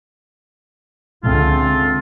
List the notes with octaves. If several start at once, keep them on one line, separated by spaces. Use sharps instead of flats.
C#2 D3 A3 C4 F4